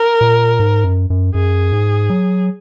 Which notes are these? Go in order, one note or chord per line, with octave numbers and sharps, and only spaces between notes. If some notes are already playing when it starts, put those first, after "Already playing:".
Already playing: A#4
A#2
G#2
F#2
F#2
F#2 G#4
G#2
F#3